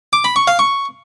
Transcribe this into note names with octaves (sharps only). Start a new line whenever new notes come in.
D6
B5
C#6
F5
C#6